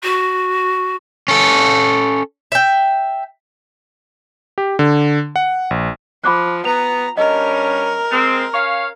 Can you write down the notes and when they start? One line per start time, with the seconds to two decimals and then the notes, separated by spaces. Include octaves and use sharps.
0.03 F#4
1.28 C#4 A4
2.52 E5 G5
4.58 G4
4.79 D3
5.36 F#5
5.71 A#1
6.24 F3 B5 D6 F#6
6.65 B3 A#5 F7
7.17 G2 G3 C#4 A#4 D#5
8.11 G#3 C4
8.54 C#4 C#5 F5